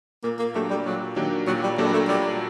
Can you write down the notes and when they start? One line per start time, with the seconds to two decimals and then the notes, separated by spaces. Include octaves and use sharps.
0.24 A#2 A#3
0.39 A#3
0.55 F#3 A3 A#3 D4 G4
0.70 G3
0.85 A#2 F#3
1.16 D#3 F#3 A#3 D4 G4
1.47 A#2 F#3
1.63 G3
1.78 F#3 A3 A#3 D4 G4
1.86 G3
1.93 A3
2.08 A#2 G3